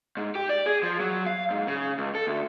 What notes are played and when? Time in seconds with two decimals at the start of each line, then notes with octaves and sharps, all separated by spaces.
0.17 G#2
0.35 G4
0.49 D5
0.66 G#4
0.83 F3
1.00 F#3
1.27 F5
1.51 G#2
1.67 C#3
1.98 C#2
2.15 A4
2.27 D2